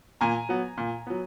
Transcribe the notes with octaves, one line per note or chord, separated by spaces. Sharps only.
A#2 G#5 A#5
F#3 B3
A#2
F#3 B3